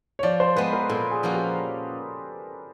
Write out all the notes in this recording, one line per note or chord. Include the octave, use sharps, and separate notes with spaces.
C#5
F3 D5
C5
G#3 B3 B4
A#4
A#2 A4
G#4
F3 A#3 C#4 F#4
G4